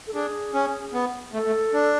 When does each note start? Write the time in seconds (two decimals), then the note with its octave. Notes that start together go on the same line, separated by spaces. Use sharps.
0.07 A4
0.14 D4 G#4
0.54 C#4
0.93 B3
1.33 A3 A4
1.47 A3
1.73 D4